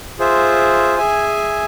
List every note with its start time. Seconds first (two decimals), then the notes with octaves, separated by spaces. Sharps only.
0.19 F4 G#4 C5 E5
0.97 G#4 E5 G#5